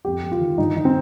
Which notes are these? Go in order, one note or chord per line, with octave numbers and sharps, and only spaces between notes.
F2 G4
F2
F4
D#3
G2 D#4
D#3 D#4
C4